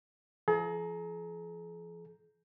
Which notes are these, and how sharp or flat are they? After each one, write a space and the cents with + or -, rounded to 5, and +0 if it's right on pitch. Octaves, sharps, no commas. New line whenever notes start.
F3 -40 G#4 +45 A#5 +0